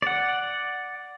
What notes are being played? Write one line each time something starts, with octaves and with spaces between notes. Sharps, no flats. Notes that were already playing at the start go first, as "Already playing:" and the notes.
D5 F#5